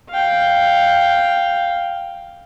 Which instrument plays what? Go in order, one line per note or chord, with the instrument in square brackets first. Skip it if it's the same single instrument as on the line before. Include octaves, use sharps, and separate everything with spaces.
[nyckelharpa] F5 G5